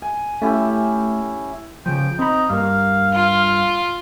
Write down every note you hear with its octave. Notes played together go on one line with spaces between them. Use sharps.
G#5
A3 C#4 E4 G4
C#3 F3 G5
C4 D#4 B5
G2 A#3 F5
F4